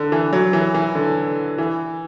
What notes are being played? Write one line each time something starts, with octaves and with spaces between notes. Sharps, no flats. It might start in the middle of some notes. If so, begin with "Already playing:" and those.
Already playing: D3
E3
F#3
E3
E3
D3
E3